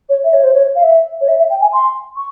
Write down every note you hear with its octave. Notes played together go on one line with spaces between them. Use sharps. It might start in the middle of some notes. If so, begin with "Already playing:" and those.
C#5
E5
C#5
C5
C#5
F5
E5
C#5
E5
E5
G5
G#5
C6
C#6